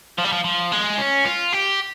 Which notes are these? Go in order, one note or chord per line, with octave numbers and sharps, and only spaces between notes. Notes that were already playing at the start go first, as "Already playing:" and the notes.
F3
G3
F3
F3
G#3
C#4
F4
G4